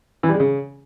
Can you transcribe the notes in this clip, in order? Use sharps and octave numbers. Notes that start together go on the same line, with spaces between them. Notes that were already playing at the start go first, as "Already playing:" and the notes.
E3
G3
G#3
C#3